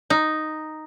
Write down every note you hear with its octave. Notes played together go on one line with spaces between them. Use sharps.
D#4